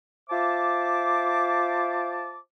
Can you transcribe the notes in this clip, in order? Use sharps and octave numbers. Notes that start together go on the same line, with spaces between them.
F4 C5 E5 A5 D6